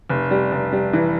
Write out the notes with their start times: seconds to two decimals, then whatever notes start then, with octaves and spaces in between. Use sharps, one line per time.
0.10 F1
0.31 G3
0.52 F1
0.73 G3
0.93 E3